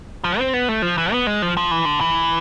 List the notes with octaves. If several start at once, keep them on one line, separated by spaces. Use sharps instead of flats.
F3
C4
B3
A3
F3
E3
B3
G#3
F3
F3
E3
D3
E3